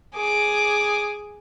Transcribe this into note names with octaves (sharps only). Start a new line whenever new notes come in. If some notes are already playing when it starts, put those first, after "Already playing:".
G#4 D6